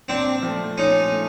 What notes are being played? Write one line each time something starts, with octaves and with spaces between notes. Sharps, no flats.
A#2 C4 D4
F3 A3
A#2 C#4 D#4
A3